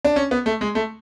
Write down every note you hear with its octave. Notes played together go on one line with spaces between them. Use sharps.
D4
C#4
B3
A3
G#3
A3